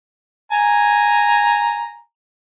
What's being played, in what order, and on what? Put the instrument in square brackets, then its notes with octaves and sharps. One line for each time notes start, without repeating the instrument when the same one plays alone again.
[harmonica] G#5 A#5